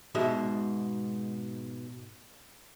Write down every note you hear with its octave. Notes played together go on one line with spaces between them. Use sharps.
G#2 B2 G#3 E5